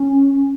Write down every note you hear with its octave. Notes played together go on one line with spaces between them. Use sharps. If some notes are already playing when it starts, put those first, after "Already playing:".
Already playing: C#4